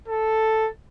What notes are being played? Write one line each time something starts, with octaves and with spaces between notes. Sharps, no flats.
A4